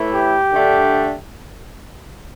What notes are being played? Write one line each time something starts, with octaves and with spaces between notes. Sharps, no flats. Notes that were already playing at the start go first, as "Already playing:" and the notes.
Already playing: A2 E3 A3 E4
G4
D3 A3 D4